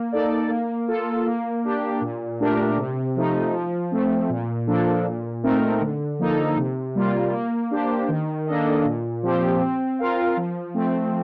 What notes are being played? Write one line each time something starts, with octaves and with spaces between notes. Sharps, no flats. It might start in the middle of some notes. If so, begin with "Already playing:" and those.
Already playing: A#3
D#4 A4 D5
A#3
F4 A4
A#3
D4 G4
A#2
A3 D4 G4 A#4
C3
F3 A3 D#4
F3
A3 C4
A#2
F3 A#3 D4 A4
A#2
A3 C4 D#4 A#4
D3
F3 A#3 D#4 A4
C3
G3 A#3 F4
A#3
D4 G4 C5
D#3
A#3 D4 A4 D#5
A#2
F3 C4 G4 C5
C4
F4 A#4 F5
F3
A3 C4